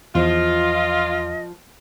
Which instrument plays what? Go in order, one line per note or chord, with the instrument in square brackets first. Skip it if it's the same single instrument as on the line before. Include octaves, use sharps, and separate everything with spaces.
[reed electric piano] E2 [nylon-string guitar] F3 [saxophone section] F4 [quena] D#5